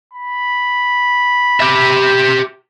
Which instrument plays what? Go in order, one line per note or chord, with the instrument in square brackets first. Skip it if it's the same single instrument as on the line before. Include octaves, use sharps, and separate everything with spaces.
[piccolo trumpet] B5
[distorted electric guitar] G4 E5